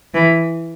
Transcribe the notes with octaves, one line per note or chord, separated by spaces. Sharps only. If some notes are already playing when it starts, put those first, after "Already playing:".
E3